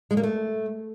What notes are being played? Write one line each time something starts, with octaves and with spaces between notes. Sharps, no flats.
G#3
A#3
A3